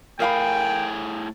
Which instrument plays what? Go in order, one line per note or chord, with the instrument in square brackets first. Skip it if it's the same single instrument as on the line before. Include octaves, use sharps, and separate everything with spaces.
[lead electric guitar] A2 G#4 [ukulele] A#4 F5 B5 [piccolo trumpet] G5